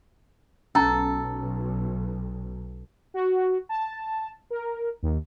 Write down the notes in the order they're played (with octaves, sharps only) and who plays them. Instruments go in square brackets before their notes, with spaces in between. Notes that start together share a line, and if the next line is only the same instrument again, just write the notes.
[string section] B1 [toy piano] C#4 A#5 [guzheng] A4
[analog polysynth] F#4
A5
A#4
D#2